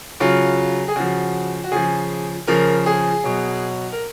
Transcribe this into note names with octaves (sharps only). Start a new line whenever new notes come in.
C#3 F#3 F4
G#4
C#3 F3 F#4
F#4
C#3 F3 G#4
C#3 F3 A#4
G#4
B2 F#3
A#4